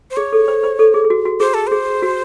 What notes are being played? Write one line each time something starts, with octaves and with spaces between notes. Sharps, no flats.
C5
G#4 C#5
A4
C5
C5
A4
G#4
G#4
F#4
F#4
G#4 C5
A4
G#4 C5
F#4